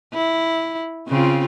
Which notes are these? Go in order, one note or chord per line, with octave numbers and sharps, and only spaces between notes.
E4
C#3 C4 F4